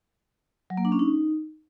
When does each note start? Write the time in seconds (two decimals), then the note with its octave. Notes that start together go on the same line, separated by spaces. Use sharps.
0.70 F#3
0.77 A#3
0.85 D4
0.92 C#4
0.99 D#4